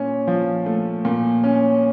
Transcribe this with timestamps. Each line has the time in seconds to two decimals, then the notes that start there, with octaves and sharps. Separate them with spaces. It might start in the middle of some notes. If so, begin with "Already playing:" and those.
Already playing: A#2 C#4
0.27 F3
0.66 A3
1.05 A#2
1.44 C#4